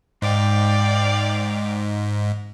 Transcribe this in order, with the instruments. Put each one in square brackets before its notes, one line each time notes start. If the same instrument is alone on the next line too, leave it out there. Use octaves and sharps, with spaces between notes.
[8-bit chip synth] G#2 [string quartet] D5 F5 G5